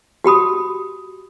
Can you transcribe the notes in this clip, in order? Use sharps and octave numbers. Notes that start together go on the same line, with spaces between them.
F#4 G4 B5 D#6